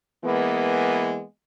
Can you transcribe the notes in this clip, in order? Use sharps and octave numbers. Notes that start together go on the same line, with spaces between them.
E3 G#3 A#3 B3